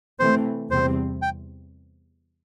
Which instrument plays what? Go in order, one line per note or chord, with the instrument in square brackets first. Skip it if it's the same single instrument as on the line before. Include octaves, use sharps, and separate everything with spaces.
[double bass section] C3 E3 A3 C4 [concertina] C5
[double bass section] E2 C3 G3 C4 [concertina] C5
[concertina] G5